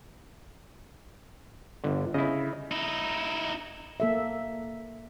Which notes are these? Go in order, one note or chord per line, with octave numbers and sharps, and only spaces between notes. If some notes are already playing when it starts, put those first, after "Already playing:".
G1 D3
C#3 E4 D#5
D#4 E4
A#3 A4 E5